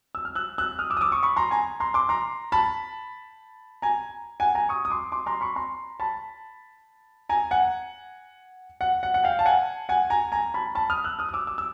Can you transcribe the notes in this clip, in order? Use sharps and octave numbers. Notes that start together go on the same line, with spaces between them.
E6
F6
E6 F#6
E6 F#6
D#6 F6
D6 E6
D#6
D6 E6
C#6 D#6
B5 C#6
A#5 C6
G#5 A#5
A#5 C6
C6 D6
A#5 C6
A5 B5
G#5 A#5
F#5 G#5
G#5 A#5
C#6 D#6
D#6
C6 D6
C6 D6
A#5 C6
B5 C#6
A#5 C6
A5 B5
G#5 A#5
F#5 G#5
F#5
F#5
F#5
F5 G5
A5
F#5 G#5
F#5 G#5
G#5 A#5
G#5 A#5
A5 B5
A5 B5
D#6 F6
E6 F#6
D#6 F6
D#6
D6 E6
D6 E6
E6